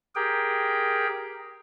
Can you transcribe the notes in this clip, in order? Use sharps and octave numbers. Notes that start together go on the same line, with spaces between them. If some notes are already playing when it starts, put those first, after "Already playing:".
G4 G#4 A#4 G5